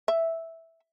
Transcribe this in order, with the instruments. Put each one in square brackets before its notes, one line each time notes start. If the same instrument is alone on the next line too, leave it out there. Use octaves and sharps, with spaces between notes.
[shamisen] E5